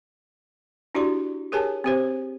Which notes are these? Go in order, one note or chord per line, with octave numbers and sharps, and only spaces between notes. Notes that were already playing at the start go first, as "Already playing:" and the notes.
D4 E4 F#4 G4 D5 C6
G4 G#4 A#4 C#5 G#5 A5
C4 G4 C5